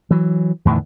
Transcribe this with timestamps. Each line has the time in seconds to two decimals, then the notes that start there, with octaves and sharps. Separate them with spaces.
0.11 E3 F#3
0.65 E2 A2 D3 D#3